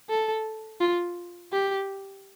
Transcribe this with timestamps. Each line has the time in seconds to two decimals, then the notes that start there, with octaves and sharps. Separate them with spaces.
0.10 A4
0.80 F4
1.52 G4